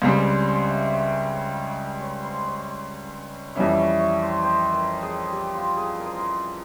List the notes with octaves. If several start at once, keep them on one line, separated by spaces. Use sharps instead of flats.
C#2 C#3 G3 C4 G#4
C5
C#5
E5
C#5
C#5
C#5
C5
C#5
F2 E3 G3 C#4 E5
C#5
C#5
C5
C5
A#4
G#4
G4
F4
G#4
A#4
C5
A#4